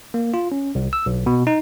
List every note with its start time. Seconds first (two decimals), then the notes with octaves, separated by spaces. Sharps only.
0.14 A#3
0.34 F4
0.52 C#4
0.75 C2
0.93 E6
1.06 B1
1.26 B2
1.47 D#4